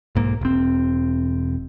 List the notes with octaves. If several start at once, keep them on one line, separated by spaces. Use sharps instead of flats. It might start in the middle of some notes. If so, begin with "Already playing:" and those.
B1 G#2 A#3
E1 C4